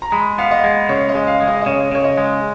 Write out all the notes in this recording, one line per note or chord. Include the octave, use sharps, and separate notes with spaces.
A#5
G#3 B5
B3 F5
D#5
G#3
C#3 C#5
D#5
G#3
F5
G#3
D#5
D#5
C#3 C#5
C#3 C#5
D#5
G#3